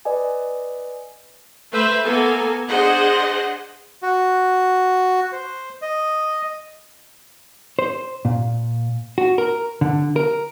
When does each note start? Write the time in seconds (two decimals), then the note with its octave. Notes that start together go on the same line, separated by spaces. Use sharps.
0.05 B4 D5 D#5 G#5
1.72 A3 B4 C5 E5
2.04 A#3 B3 A4 G#5
2.68 D4 G#4 C5 D#5 F#5
4.02 F#4
5.32 C5
5.82 D#5
7.79 C5
8.25 A#2
9.18 F#4
9.38 A#4
9.81 D3
10.16 A#4